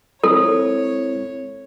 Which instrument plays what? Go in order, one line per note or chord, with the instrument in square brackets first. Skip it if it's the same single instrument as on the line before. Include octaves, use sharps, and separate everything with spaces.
[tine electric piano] G#3 C4 E4 [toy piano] A4 [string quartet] C#5